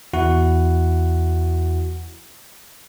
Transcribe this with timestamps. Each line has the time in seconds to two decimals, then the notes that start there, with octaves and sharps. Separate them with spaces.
0.13 E2 E4 F#4 F#5